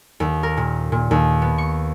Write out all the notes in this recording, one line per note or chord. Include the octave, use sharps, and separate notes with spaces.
D#2
A#4
A#2
A#2
D#2
B3
C#6